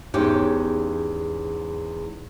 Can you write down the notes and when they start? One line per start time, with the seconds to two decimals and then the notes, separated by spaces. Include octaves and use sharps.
0.14 E2 G#2 C#4 G4